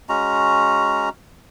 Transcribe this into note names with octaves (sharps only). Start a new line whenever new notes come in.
G#3 C#4 F#4 A#5